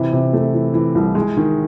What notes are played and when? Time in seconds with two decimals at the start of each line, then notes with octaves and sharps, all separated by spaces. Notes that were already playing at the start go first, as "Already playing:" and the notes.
Already playing: C3 E3
0.12 C3
0.33 A3
0.54 E3
0.74 E3
0.95 C2
1.15 G#3
1.37 D#3